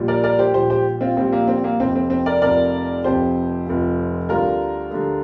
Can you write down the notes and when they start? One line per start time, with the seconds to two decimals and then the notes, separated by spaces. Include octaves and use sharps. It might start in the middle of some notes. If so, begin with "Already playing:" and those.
Already playing: A#1 A#2 G3
0.08 A#4 D5
0.24 A#4 D5
0.39 G4 C5
0.54 A#1 A#2 G3 G4 C5
0.70 G4 C5
1.01 C4 F4
1.17 A#1 A#2 G3 C4
1.32 A#3
1.48 C4
1.64 A#3
1.79 F1 F2 C3 F3 C4
1.96 C4
2.10 C4
2.26 A#4 D5
2.42 F1 F2 C3 F3 A#4 D5
3.04 F1 F2 C3 F3 G4 C5
3.66 F1 F2 C3 F3
4.29 D2 D3 G3 F4 A#4
4.91 D2 D3 G3